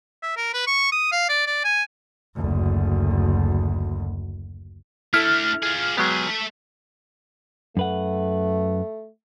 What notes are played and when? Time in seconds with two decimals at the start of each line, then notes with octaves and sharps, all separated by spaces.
0.23 E5
0.37 A#4
0.54 B4
0.67 C#6
0.92 D#6
1.12 F5
1.29 D5
1.47 D5
1.64 G#5
2.36 F#1 D2
5.14 A3 D4 E4 A4 F6
5.63 F4 G#4
5.97 F#3 G#3 B3 G4 G#4
6.27 A3 E5
7.77 F#2 A3 B4 F#5